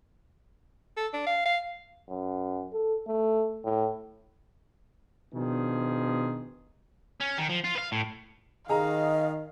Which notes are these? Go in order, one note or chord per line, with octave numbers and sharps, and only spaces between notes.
A4
D4
F5
F5
F#2
A4
A3
A2
B2 D#3 F3 D4 G#4
C#4
D#3
F3
F4
B4 F5
A2
D#3 G#4 D#5 F5 A#5